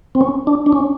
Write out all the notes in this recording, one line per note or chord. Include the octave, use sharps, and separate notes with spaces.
C4
C#4
D4
D4
C#4